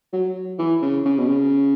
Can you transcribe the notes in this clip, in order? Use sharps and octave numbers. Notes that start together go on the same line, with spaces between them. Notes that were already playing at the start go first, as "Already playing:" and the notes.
F#3
E3
C#3
C#3
B2
C#3